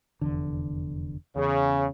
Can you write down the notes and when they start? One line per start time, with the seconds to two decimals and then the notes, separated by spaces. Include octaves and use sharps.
0.21 F1 E2 D3
1.36 E2 C#3